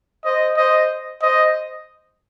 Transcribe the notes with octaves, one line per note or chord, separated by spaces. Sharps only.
C5 D#5
C5 D#5
C5 D#5